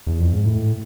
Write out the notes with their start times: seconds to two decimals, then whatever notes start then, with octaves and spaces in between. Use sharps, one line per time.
0.07 E2
0.20 F2
0.33 G#2
0.45 A2